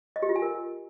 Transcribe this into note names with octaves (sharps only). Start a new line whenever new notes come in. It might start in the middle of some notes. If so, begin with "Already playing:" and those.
D#5
G4
F4
G#5
A#4